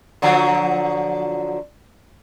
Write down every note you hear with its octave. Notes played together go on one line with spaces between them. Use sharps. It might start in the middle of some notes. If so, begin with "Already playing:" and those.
D3 F3 F#3